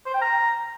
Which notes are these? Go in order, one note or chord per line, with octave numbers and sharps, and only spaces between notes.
C5
G5
A#5